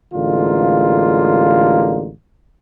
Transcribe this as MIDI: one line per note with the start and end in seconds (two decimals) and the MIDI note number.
0.14 2.10 33
0.14 2.10 50
0.14 2.10 56
0.14 2.10 58
0.14 2.10 65